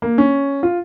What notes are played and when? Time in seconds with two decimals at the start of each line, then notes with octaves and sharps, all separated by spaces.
0.02 A#3
0.18 C#4
0.63 F4